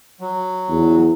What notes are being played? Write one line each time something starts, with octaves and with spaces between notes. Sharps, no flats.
F#3
E2